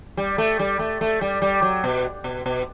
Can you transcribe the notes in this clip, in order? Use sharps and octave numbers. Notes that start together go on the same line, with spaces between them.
G3
A3
G3
A3
A3
G3
G3
F#3
B2
B2
B2